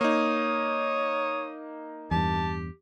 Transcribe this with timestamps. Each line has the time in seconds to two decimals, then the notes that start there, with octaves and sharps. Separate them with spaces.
0.01 A#3 D#4 C#5 D#6
2.11 E2 G2 G4 A5